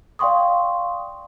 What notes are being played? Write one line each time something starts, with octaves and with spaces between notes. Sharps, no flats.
D5 F5 G5 C6 C#6 D#6